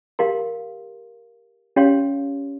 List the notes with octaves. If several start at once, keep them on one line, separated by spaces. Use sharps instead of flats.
G4 A#4 F5 C6
C#4 G4 C#5 F5 C6